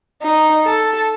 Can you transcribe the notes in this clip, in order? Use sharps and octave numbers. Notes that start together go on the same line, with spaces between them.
D#4
A4